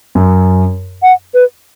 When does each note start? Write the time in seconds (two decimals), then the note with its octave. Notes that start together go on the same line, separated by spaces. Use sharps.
0.15 F#2
1.03 F#5
1.34 B4